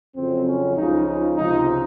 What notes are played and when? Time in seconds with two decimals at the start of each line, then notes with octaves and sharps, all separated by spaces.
0.16 F2 C#3 F#3 C4
0.46 C#4
0.77 C#2 C#3 F3 D#4
1.07 D#4
1.37 C#2 C3 F3 D#4